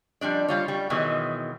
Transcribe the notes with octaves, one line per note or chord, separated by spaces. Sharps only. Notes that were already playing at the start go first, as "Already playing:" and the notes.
F3 G3 D4 D5
G3 F4 C#5
G3
B2 D#3 E3 F#3 G#3